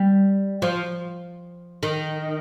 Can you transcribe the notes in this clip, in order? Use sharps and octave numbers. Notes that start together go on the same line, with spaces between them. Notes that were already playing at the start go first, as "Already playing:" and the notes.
Already playing: G3
F3
D#3